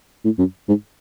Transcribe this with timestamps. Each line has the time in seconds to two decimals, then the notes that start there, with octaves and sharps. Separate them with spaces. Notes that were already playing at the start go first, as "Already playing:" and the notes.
0.25 A2
0.39 F#2
0.68 G#2